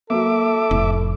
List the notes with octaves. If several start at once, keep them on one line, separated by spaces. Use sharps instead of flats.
F#3 A#3 A4 E5 D6
F1 A2